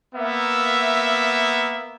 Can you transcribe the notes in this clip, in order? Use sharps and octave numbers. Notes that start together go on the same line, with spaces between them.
A#3 B3 E5